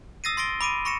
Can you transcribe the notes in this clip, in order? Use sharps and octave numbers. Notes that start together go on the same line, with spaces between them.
D#6 E6 A6 A#6 C7 D#7
C6 A6 A#6 D7 G7
B5 D6 D7 D#7
B5 C#6 A#6 C#7 E7